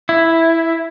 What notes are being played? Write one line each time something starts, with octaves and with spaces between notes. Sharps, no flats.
E4